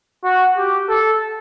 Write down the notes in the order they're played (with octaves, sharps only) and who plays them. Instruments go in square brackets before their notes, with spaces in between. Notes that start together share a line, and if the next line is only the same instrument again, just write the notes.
[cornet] F#4
G4
A4